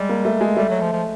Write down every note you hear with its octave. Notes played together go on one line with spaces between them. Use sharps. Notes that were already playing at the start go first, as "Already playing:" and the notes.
Already playing: G3 G#3
A#3
A3
G#3
G3 A3
F#3
F3
F3